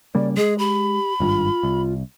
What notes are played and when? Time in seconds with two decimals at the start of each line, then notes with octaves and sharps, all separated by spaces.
0.15 C#3 G3 A#3 D5
0.37 G#3 G#4 D#5
0.59 G4 B5
1.20 G#1 G2 F4
1.63 C2